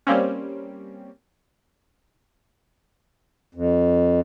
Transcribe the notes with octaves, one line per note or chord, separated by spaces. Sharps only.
G3 A#3 C4 C#4
F2